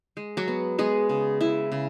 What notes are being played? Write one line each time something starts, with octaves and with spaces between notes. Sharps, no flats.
G#3
F#3 F#4
B3
G#3 B3 G#4
C#3
C#3 E4 E5
C#3